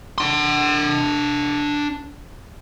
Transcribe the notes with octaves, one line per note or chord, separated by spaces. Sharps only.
D4 C6